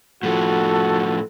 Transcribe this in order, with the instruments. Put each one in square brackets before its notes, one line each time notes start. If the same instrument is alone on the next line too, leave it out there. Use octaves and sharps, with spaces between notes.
[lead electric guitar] A2 F3 [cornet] F#4 [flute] A4